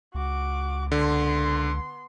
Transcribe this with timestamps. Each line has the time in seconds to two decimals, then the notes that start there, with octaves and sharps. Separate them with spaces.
0.15 C#2 F#4 D6
0.92 D3 B3 C6